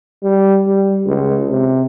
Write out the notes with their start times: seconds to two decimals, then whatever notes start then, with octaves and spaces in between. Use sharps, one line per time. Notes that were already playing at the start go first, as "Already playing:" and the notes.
0.23 G3
0.67 G3
1.06 C#2
1.49 C3